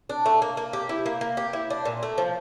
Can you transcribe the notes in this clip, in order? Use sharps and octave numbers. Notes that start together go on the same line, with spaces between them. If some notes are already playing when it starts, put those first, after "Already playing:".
D4
A3
A#3
A#3
G4
E4
A#3
A#3
G4
E4
D4
A#2
A3
F3